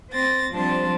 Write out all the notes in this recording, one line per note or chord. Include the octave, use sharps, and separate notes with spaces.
C4 A6 A#6
F3 G3 C4 D4 A5